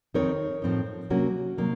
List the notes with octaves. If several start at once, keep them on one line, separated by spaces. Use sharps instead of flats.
F2 D#3 F#3 C4 D#4 A#4 C#5
A2 F3 C4 D#4
C3 F#3 A#3 C#4 F#4
C3 F#3 A#3 D#4